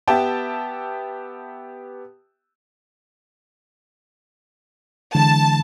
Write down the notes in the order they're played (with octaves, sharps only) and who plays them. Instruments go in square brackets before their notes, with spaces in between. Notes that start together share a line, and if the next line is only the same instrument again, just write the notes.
[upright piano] B3 G4 E5 G5 A5
[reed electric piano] D3 E3 G#3 [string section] A5